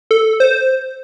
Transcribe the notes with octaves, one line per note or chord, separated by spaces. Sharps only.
A4
C5